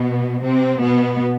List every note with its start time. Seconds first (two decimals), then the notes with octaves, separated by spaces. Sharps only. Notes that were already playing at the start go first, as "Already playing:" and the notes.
Already playing: B2 B3
0.43 C3 C4
0.81 B2 B3